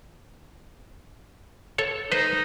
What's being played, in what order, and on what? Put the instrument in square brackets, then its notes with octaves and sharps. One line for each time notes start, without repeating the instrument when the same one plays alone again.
[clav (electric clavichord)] A4 C#5
[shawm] D#4 [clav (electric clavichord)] B4 C5